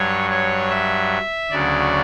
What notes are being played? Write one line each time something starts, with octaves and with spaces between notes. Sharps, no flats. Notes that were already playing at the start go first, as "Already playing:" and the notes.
Already playing: G2 F#3 C#5
C#5
E5
D2 C#3 F#3 D5